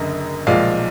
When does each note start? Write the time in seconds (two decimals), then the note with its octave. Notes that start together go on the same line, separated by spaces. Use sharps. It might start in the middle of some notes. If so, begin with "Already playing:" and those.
Already playing: F#1 F#2 D3 D#5
0.47 B1 A#2 F3 G#3 D5 F5